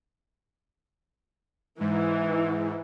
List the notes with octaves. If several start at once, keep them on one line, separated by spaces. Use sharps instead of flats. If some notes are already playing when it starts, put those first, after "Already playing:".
G#2 E3